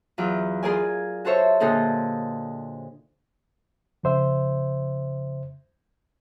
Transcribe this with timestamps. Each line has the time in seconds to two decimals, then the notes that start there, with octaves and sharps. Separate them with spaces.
0.18 E2 F#3 F4 D6
0.63 F4 G#4 A#4 D5 G#5
1.25 F#4 A4 C5 C#5 E5
1.60 A#2 D3 D#4 G#4 A4
4.03 F2 C#3 C5 E5